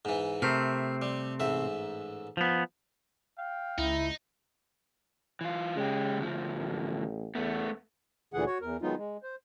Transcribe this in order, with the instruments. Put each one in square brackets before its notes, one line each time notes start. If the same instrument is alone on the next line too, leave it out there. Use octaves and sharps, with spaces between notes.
[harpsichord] G#2 E3
[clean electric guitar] C3 A3 C4 [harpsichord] A#4
[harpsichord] G3
A1 G#2 E5
[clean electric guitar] F3 B3
[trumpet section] F5 G5
[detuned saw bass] C#2 [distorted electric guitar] D#4 [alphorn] E4
[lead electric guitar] E3 F4
[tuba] C#3 [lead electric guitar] G#3 G4
[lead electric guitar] D2 F3
[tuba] A1
[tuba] E2 [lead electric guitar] A3 B3
[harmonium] D2 A#2 D3 E3 G#4 F#5
F#4 C#5
E2 A#4
D#3 F#3 G#3 B3 D#4 F4
G#3
C5